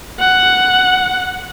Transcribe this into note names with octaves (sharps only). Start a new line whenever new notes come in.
F#5